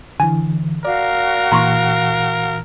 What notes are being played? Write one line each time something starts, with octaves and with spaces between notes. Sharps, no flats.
D3 E3 G#5
F#4 A#4 D5 F5
A#2 E3 A#5 C6 C#6